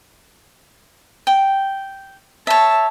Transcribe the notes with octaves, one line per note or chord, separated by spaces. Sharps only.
G5
C#5 E5 A5